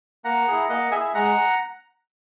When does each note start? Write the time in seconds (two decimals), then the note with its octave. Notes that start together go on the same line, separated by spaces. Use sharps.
0.24 A#3 F#5 A#5
0.48 E4 G#4
0.69 A#3 D#5 F#5
0.92 E4 G#4 E5 G#5
1.14 G#3 F#5 A#5